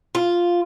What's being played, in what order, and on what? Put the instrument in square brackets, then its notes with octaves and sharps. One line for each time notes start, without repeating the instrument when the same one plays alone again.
[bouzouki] F4